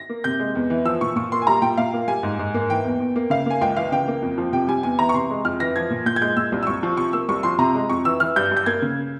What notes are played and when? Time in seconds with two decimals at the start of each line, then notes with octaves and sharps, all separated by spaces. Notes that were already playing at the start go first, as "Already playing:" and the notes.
Already playing: A#6
0.09 A#3
0.24 C3 G6
0.39 G#3
0.55 E2
0.70 E3
0.85 F3 E6
1.01 A#2 C#6
1.16 A#2 C#6
1.32 A#3 C6
1.42 G#5
1.47 G3 A#5
1.62 A#2 G5
1.78 A#2 F5
1.93 A#3
2.08 G3 G#5
2.23 G#2
2.39 G#2
2.54 A#3
2.70 E3 G5
2.84 E2
3.00 E2
3.16 A#3
3.30 C#3 F5
3.46 A#3 G#5
3.61 C#2 G5
3.76 E3 F5
3.92 C#3 G5
4.08 A#3
4.22 F2
4.38 F3
4.52 C3 G5
4.68 G3 G#5
4.83 E2 G#5
4.99 E3 A#5
5.09 C#6
5.14 C3 C6
5.30 G#3
5.45 F2 F6
5.60 E3 A#6
5.76 F3 G#6
5.90 A#2
6.06 A#2 G6
6.16 G#6
6.22 G#3 G6
6.37 A#2 E6
6.52 C2
6.63 E6
6.67 C2 C#6
6.83 F3
6.97 C3 C#6
7.13 A#3 E6
7.29 C2 C#6
7.43 F3 C6
7.59 C3 A#5
7.75 G#3
7.90 F2 C#6
8.05 E3 E6
8.20 E3 F6
8.36 G2 G6
8.51 G2
8.57 G6
8.66 A#3 G#6
8.82 C#3